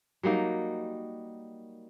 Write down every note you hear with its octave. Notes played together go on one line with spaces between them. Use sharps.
F#3 G3 A#3 D#4